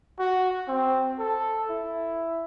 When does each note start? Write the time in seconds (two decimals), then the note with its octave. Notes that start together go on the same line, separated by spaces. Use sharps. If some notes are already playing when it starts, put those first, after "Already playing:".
0.19 F#4
0.68 C4
1.19 A4
1.70 E4